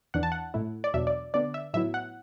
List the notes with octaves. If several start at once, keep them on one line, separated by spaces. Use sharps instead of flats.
E2 E3 D4 F#5
A5
F#5
A2 A3 E4
D5
E2 B2 F#3 D4 E5
D5
D3 B3 D4 D5
E5
A2 F#3 B3 E4 E5
F#5